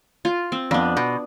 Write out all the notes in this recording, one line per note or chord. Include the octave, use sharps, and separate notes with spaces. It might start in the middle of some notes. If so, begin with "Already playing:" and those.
F4
C4
F2 B3 D4
B2